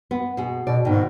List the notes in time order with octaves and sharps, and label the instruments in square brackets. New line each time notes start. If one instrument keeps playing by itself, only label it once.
[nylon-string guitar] B3
B2 G#4
[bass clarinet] B2 [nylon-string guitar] D5
[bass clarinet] G#2 [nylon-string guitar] B2 D#3